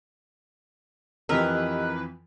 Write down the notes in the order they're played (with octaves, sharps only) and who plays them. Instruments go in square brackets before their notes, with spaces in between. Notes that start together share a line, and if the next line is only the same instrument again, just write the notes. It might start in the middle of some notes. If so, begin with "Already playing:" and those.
[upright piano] F2 E3 F3 [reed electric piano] G4 D#5 E6 [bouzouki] A#4 [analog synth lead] B4